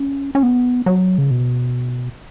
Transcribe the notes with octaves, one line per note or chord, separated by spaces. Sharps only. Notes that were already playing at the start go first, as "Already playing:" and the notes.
Already playing: C#4
C#4
B3
F#3
C#3
B2